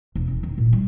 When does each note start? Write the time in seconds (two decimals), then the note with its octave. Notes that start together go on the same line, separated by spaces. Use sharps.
0.15 E1
0.28 C#4
0.43 D#3
0.58 A#2
0.73 G3